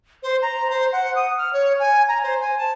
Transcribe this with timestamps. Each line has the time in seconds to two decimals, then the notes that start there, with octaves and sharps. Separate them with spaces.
0.23 C5
0.42 A#5
0.70 C5
0.92 F#5
1.15 D#6
1.38 F6
1.53 C#5
1.79 G#5
2.08 A#5
2.23 C5
2.41 G#5
2.58 A5